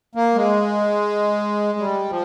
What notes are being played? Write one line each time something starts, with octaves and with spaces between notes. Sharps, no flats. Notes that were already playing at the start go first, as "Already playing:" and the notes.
A#3
G#3
G3
F3